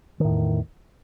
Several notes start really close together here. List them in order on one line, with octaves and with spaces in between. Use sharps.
D#3 A2 E2